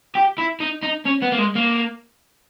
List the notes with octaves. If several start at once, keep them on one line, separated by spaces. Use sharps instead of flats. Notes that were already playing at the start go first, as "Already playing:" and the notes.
G4
E4
D#4
D#4
C#4
B3
A#3
G#3
A#3